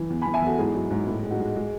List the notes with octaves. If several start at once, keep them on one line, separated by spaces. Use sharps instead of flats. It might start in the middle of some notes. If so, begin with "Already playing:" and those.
Already playing: E3
E2
G#5 B5
E2
E5 G#5
E2 F#4 A4
G#2 E4 G#4
F#3
G#2
A2 E4
G#3
D#4 F#4
G#3
G#3